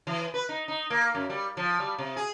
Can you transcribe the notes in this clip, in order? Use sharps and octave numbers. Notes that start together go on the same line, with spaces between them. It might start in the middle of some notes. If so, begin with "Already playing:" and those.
E3
B4
D#4
D#4
A#3
F#2
G3
F3
G3
C3
G#4